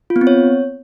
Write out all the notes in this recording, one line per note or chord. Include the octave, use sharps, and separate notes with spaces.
F4
B3
C4
C#5